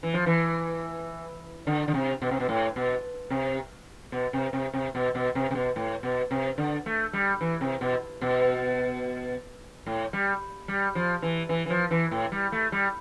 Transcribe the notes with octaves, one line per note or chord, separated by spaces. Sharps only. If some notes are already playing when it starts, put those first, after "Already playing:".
E3
F3
E3
D3
D3
C3
B2
C3
B2
A2
B2
C3
B2
C3
C3
C3
B2
B2
C3
C3
B2
A2
B2
C3
D3
A3
G3
E3
C3
B2
B2
A2
G3
G3
F3
E3
E3
E3
F3
E3
A2
G3
A3
G3